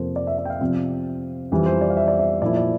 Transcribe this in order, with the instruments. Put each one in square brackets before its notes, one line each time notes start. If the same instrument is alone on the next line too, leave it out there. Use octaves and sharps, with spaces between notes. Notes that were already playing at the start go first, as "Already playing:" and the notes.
Already playing: [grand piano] F2 C3 F3 A#3 C5
D5
E5
E5
G5
F5
C3 F3 C4
F2 E3 G3
C5
D5
F5
E5
D5
E5
A#2 F3 A#3 E4 D5
D5